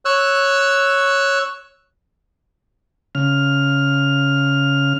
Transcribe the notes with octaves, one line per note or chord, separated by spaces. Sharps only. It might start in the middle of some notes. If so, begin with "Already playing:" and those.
C#5 E6 F#6
C#3 F6